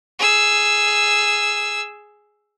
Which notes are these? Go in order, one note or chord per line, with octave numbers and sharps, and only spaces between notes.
G#4 E6